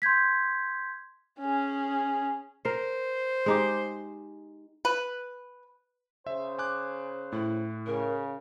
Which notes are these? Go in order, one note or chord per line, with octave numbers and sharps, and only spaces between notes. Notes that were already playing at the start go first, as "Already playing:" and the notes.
C6 G6 G#6 B6
C#4 G#4
A#4 C5
G#3 D#4 G4
B4
C#3 C5 E5
G#5 D6 F#6
A2 E4
C#3 A#4